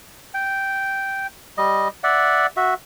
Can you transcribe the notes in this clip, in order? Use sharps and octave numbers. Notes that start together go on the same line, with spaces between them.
G5
G3 D#5
D5 E5 F#5
F#4 E5